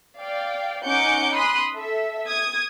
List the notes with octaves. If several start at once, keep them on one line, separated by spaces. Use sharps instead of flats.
D5 F5 G5
C#4 D#4 F#5 D6 G6 C#7
B5 C6 D#6 F#6
A4 E5
D#6 G#6